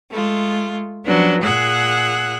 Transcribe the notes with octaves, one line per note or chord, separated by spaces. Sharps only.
G#3 A3 F4
F3 F#3 B3 C#4 D4
A#2 G#4 F#5 E6 F#6